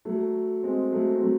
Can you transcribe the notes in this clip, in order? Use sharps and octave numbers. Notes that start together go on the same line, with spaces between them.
F#3 A3
G#3 C4
F#3 A3
C4
F#3 A3